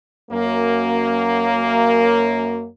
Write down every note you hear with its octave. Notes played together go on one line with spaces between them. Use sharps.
F#2 A#3